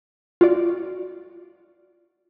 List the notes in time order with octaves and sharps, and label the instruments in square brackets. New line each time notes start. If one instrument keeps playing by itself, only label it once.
[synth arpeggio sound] F4 F#4 D5